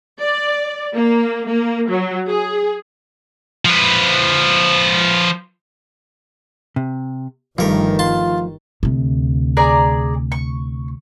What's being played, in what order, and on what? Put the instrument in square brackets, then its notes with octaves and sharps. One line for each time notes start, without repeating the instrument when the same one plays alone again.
[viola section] D5
A#3
A#3
F#3
G#4
[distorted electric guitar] F3 B4
[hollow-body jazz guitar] C3
[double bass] G1 D#3 [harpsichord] G2 A#4 [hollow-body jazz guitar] F3 A3
[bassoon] F4 [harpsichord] A5 C6
[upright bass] D2 C3
[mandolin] G#4 D5 A#5
C#6